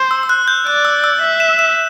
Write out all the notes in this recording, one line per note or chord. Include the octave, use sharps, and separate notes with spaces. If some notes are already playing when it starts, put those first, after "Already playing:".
Already playing: C5
E6
E6
F#6
G6
D5 F#6
E6
E6
E5
E7
E7